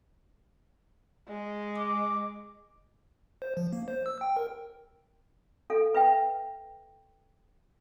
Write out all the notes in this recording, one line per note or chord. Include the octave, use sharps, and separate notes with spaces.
G#3
D6
C5
F3
A#3
C5
E6
G5
A#4
A4 F5
B4 E5 G5